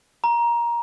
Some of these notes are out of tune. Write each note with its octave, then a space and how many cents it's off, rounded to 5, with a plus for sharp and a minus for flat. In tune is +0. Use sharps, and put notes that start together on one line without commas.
A#5 +20